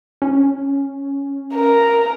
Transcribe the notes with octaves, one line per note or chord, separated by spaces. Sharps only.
C#4
A#4